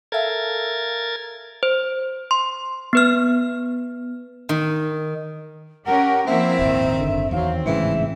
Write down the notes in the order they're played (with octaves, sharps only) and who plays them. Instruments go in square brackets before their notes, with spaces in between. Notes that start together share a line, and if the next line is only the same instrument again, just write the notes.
[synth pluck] A4 E5 F5 [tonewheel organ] A#4 G#6 A6
[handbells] C5
C6
B3 B4 F6
[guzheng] D#3
[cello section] C#4 G4 A#4 [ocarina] F#5
[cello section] F3 A#3 E4 [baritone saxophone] C4 [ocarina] E5
[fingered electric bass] D#1 G#1 [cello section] D#3
[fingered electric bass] F#1 D3
[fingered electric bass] E2 D#3 [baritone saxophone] F#3 [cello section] C4 [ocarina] F5
[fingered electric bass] A1 G#2 C#3 [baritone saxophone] E3 [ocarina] E5